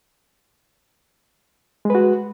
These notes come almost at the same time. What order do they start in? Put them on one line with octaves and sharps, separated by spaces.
G#3 B4 F#4